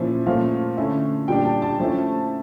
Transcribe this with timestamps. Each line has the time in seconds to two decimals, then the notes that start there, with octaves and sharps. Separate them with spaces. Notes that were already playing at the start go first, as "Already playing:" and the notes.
Already playing: A#2 F3 C#4 E4
0.26 A#2 F3 A3 C#4 F5
0.77 D3 A3 C#4 E4
1.28 A#2 G3 D4 G5
1.45 A5
1.62 A5
1.79 F3 A3 C#4 E4